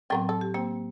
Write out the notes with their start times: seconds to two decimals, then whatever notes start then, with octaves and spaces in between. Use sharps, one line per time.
0.10 A2 F#3 B3 C4 A#4 G5
0.29 A4
0.41 G4
0.54 A#3 C4